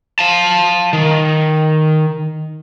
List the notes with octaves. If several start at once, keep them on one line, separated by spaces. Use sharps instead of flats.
F5 A5
D#3